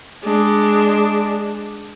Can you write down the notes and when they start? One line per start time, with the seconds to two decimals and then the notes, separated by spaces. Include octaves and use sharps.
0.23 G#3 D4